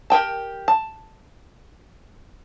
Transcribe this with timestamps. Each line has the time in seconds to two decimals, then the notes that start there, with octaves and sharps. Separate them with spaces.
0.10 G4 A#4 G5 A5
0.68 A5